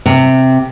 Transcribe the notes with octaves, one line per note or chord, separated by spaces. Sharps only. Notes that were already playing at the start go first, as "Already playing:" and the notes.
C3